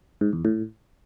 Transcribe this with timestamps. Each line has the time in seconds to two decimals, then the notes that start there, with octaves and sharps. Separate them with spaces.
0.21 G#2
0.33 E2
0.45 A2